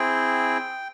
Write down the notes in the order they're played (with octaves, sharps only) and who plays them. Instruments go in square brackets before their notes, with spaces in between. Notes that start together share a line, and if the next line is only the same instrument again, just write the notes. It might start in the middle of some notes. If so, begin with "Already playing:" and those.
Already playing: [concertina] C4 E4 G#4 G5